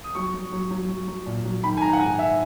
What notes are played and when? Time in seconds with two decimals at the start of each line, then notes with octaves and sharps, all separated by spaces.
0.04 D#6
0.15 F#3 C#6
0.34 F#3
0.52 F#3
0.70 F#3
0.89 F#3
1.07 F#3
1.26 A#2
1.44 F#3
1.63 D#3 B5
1.77 G#5
1.81 G#2 A#5
1.93 F#5
2.00 G#2 G#5
2.18 G#2 E5